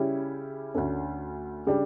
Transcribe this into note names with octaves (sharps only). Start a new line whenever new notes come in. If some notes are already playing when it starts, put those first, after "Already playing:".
Already playing: C#3 G3 C#4 E4 G4
D2 D3 A3 C#4
C#3 G3 D4